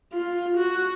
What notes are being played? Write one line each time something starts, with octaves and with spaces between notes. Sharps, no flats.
F4
F#4